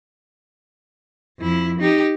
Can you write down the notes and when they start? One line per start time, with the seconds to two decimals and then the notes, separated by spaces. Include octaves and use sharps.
1.39 F2 E4
1.80 D#4 G4